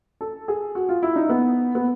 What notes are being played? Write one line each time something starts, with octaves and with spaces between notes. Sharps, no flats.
A4
G#4
F#4
F4
E4
D#4
B3
B3